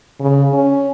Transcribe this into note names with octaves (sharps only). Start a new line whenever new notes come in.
C#3
C#4